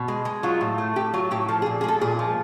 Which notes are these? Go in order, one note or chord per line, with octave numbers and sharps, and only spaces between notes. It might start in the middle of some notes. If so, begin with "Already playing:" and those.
Already playing: B2
G#3
G#3
F#3 F4
A2
A3
A2 G4
F#3 F4
A2 G4
F3 A4
G#4
A#2
G#4
G#3 A4
A#2 G#4
F3